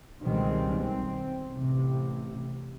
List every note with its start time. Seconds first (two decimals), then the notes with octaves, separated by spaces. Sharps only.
0.22 C#2 B2 D#3 G3 G#3 C4
0.79 B1 C4
1.52 A1 C3